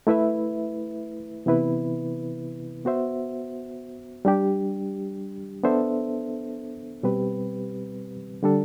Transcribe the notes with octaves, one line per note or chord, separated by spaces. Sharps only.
A3 E4 B4 E5
C3 E3 B3 E4 B4
B3 F#4 C5 E5
G3 D4 G4
B3 D4 A4 C5 E5
B2 G3 C4 G4 B4
D3 G3 D4 A4